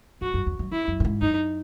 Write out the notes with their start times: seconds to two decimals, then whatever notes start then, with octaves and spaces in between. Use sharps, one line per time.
0.21 F#2 F#4
0.34 F#2
0.47 E2
0.59 F#2
0.71 E2 E4
0.88 F#2
1.00 A2
1.05 G#2
1.21 F#2 D#4